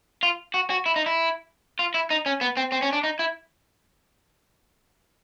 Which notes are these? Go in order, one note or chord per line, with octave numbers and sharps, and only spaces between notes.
F4
F#4
F#4
E4
D#4
E4
F4
E4
D#4
C#4
B3
C4
C4
C#4
D4
D#4
E4